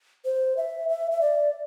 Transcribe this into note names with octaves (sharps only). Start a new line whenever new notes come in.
C5
E5
E5
E5
D5